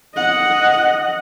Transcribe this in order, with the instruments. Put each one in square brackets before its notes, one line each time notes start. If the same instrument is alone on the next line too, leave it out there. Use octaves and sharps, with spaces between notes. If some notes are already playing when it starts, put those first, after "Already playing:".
[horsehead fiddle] D#5 F#5